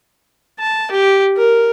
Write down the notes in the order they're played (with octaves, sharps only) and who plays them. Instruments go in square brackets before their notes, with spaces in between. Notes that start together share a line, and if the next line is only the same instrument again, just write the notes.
[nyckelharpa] A5
G4
A#4